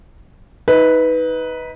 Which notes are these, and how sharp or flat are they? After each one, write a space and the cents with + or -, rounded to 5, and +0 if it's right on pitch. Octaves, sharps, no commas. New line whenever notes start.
D#4 +30 B4 +0